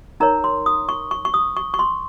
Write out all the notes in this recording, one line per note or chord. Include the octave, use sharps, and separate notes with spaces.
D#4 A#4 C#5 A#5
C6
D#6
C#6
C#6
C#6
D#6
C#6
C#6
C6